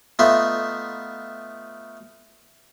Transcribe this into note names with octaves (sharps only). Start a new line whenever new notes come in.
A3 B3 D#4 F4 E5